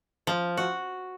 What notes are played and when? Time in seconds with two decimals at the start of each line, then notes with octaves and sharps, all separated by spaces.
0.27 F3
0.57 F#4